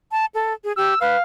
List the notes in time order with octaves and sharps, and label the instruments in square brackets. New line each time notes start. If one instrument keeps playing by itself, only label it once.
[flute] A5
A4
G#4
[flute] G4 [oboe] E6
[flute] B4 [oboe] F5